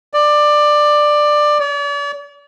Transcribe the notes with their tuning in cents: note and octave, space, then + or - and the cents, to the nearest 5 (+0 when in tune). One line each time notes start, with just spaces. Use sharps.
D5 +15
D5 -45